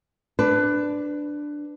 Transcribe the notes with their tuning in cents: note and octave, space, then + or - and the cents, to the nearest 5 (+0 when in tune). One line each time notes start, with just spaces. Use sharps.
D4 +0 B4 +15